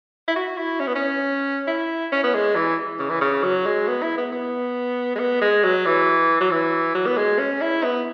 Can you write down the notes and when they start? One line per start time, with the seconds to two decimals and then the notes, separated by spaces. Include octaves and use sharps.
0.28 E4
0.36 F#4
0.57 E4
0.80 C#4
0.87 B3
0.95 C#4
1.67 E4
2.12 C#4
2.23 B3
2.34 G#3
2.55 E3
2.99 C#3
3.09 E3
3.21 C#3
3.43 F#3
3.66 G#3
3.88 B3
4.02 E4
4.17 B3
4.32 B3
5.15 G#3
5.19 B3
5.41 G#3
5.64 F#3
5.86 E3
6.40 F#3
6.51 E3
6.95 F#3
7.06 B3
7.17 G#3
7.39 C#4
7.61 E4
7.83 B3